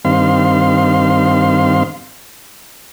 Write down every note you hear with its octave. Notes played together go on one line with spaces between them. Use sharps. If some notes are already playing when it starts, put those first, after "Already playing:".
G2 D#3 C4 F5 C6